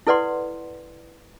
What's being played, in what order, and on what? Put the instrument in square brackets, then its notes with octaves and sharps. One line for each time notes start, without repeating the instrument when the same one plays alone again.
[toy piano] E4 A4 B4 D5 F#5 C6